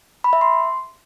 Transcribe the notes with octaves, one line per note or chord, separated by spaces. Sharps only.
B5
E5
C6